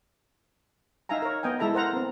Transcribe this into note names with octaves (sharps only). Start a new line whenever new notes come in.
D#4 E5 F5 G#5 A#5
A#4 C#5
B3 D#5 G5 G#5
G#3 E4 A4 E5 A#5 B5
A#4 C5 F#5 A#5
B3 C4